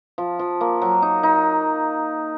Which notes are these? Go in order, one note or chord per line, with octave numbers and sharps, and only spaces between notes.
F3
F3
A#3
F#3
D#4
D#4